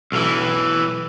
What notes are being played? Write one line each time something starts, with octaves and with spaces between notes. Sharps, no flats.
B1 E3